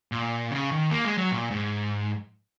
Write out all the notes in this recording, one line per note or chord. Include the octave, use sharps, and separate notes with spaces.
A#2
C#3
D#3
A#3
G#3
F#3
A#2
G#2